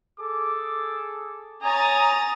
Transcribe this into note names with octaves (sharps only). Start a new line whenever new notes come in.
G#4 A4 D6
C#5 G#5 A#5 D#6 A6